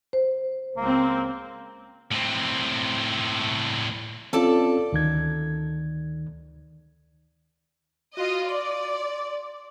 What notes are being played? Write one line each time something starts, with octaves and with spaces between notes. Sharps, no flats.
C5
C#2 A#3 C4
A2 C4
C4 C#4 F4 A4 D5 A5
D2 D#3 G#6
F4 F#4 D#5
D5 C6